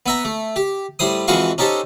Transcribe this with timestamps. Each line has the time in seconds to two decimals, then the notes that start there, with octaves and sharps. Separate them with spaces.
0.06 B3 E5 A#5
0.25 A3
0.56 G4
0.99 A2 G3 C5 D#6
1.28 F2 E3 G#3 F#4 F5 C#6
1.58 C#4 D#4 G4 A4 C5